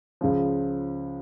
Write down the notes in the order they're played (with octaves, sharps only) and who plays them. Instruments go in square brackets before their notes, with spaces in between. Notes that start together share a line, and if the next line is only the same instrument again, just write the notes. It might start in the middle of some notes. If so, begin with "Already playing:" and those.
[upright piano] C#2 C#3 F3